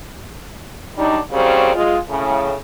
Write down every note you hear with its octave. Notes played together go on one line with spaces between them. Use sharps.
F#3 G3 D4 D#4
A#2 C#3 F#3 G3 C4
G#3 F4
A2 C#3